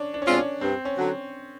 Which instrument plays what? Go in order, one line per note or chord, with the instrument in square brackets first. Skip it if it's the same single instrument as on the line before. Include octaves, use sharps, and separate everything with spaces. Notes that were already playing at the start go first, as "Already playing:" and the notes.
Already playing: [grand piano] C#4 D4
D4
C#4
[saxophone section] B2 G#3 C4 F4 [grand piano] D4
[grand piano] C#4
[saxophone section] G2 [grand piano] C4
[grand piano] C#4
[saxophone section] D3 F#3